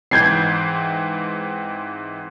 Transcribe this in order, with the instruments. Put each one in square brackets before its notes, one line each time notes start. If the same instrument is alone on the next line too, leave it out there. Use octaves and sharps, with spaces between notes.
[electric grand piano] G#2 E3 C4 [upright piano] G6 G#6 C7